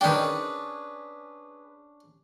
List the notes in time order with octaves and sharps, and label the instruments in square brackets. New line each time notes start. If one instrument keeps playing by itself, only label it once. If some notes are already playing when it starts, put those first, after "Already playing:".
[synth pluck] D#3 G5 [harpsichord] C#4 D4 [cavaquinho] G#4 B4